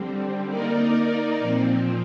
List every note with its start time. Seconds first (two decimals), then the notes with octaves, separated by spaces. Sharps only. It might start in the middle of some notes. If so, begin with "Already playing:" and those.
Already playing: D3 G3 C4
0.48 A#3 D#4 A#4 D5
1.40 A#2 F3 C4